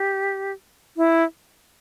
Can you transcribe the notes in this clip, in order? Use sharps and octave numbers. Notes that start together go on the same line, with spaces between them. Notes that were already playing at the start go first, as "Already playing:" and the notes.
Already playing: G4
E4